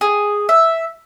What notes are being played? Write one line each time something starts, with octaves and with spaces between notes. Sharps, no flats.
G#4
E5